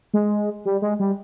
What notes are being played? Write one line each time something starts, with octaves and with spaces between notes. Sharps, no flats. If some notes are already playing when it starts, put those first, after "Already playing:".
G#3
G3
G#3
G3